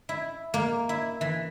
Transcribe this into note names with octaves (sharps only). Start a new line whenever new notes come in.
E4
A#3
E4
E3